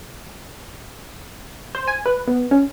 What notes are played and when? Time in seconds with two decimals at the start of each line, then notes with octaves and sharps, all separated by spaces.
1.75 C5
1.88 G#5
2.06 B4
2.28 B3
2.51 C#4